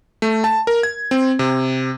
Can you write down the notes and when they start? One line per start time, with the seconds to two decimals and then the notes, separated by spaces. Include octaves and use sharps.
0.22 A3
0.44 A5
0.67 A#4
0.83 G#6
1.11 C4
1.39 C3